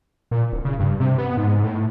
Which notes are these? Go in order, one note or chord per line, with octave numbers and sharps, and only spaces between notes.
A#2
D1
C#3
G2
C3
B3
G#2
A2